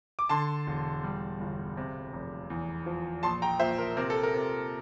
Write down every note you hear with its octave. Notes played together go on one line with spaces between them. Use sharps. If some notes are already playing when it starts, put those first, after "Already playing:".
D6
D3 A5 C6
E1
G3
G1
C3
F1
E2
F3
A#1 A5 C6
G5 A#5
A#2 C5 E5
A#4
C3 A#4
A4
A#4
C3